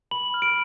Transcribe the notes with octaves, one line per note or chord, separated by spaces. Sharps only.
B5 F#7
F6
D7